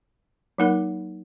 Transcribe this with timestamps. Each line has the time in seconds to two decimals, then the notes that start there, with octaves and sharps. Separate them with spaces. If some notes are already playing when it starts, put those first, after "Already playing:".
0.58 F#3 A#3 D#4 A#4